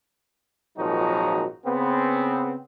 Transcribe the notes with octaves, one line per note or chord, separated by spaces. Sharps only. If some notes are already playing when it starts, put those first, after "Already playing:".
G#1 A#2 F3 F#3 D#4 F#4
C#3 B3 C4